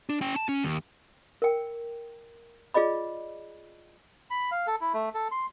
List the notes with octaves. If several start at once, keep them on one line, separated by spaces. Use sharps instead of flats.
D4
C#4 G5
A5
C#4
D#2
A#4 G5
F4 G#4 D5 D#5 B5
B5
F5
A4
E4
A3
A4
C6